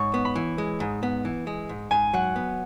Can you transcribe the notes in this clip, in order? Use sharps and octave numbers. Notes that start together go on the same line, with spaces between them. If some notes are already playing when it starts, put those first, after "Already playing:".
Already playing: G#2 C#5 C#6
B3
B5
E3
G#3
G#2
B3
E3
G#3
G#2
G#2 G#5
F#3 F#5
B3